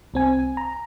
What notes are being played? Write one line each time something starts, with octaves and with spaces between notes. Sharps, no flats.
C2 C4 G#5
A#5